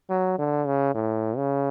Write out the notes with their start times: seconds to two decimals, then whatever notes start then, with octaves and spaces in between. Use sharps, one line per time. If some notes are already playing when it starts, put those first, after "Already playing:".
0.10 F#3
0.39 D3
0.67 C#3
0.95 A2
1.37 C#3